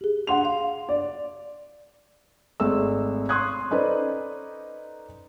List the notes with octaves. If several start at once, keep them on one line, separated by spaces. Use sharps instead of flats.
G4 G#4
F#5 C6 F7
F5
D5
G#1 G#3 A3 E6
C6 C#6 D#6 F#6 G#6
C#4 D#4 A4 B4 C5 D5